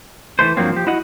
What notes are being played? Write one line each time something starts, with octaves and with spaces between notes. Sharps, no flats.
E3 G3 A3 C5
G2 F3 F#3 A#3 C4
F3 G4
E4 F#4 D#5 F#5